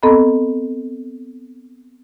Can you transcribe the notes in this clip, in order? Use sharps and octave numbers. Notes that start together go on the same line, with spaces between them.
B3 C4 A4 D#5 A#5 B5